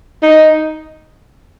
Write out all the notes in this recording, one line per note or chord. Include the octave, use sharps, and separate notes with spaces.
D#4